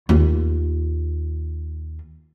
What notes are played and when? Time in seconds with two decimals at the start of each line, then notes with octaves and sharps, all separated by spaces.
0.09 D#2 F4